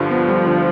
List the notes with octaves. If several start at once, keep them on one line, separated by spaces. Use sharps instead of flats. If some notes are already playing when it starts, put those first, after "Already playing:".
Already playing: G2 D3 F3 G3
B3
G3
D3